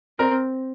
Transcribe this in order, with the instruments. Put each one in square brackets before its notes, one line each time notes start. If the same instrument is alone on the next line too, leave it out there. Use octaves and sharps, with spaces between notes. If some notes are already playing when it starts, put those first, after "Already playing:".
[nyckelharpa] C4 [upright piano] A#4 A#5